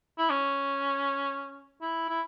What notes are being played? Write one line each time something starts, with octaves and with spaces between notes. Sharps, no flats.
E4
C#4
E4
E4